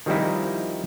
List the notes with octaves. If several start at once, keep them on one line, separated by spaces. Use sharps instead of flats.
D#3 F3 G3 C4 D#4 E4